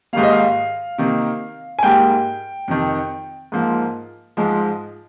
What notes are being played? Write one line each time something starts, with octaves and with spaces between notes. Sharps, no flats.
G#2 D#3 G3 A#3 F5
D#5
F5
C3 D#3 A#3
G#5
G#2 G3 A#3 G5
F2 C3 D#3
G#2 F3 A#3
G#2 F3 G#3